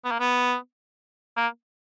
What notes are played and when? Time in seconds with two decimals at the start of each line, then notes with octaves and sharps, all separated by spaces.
0.05 B3
0.11 A#3
0.20 B3
1.37 A#3